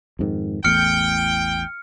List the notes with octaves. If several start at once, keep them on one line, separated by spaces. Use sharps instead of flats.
F2 G#2 D#3
A1 E2 A2 G5 F6 C#7